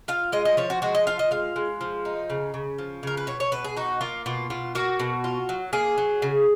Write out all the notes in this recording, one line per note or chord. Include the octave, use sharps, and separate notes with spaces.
F4 F5
G#3 D#5
D#5
F3 C#5
F#4
G#3 F#4
D#5
F4 F5
D#5
G#3 F5
G#3
F3
D#4
C#3
C#3
F3
C#3 A#4
B4
B2 C#5
C#5
B2 B4
G#4
D#4 F#4
A#3 F4
B2 F4
B2 F4
A#3 F#4
B2
F4
F#3
A#3 G#4
F#3
C#3